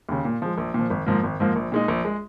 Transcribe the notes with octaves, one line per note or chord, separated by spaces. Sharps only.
D#2 C#3
A#2
F3 G#3
A#1
A#2 F3
G#1
G#2 F3 A#3
G#1
G#2 F3 A#3
A#1
A#2 G#3 D#4
A#1
G#3